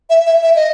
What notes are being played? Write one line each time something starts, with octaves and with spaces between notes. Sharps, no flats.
E5
E5
E5
D#5